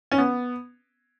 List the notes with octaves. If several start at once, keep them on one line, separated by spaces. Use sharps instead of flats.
C#4
B3